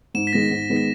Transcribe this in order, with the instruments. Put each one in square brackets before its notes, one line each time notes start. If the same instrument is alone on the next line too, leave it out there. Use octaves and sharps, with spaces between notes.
[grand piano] G#2 [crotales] E7
[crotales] B6
[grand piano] D#3 G#3 B3 [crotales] A#6
[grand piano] G#2
D#3 G#3 B3
[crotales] B6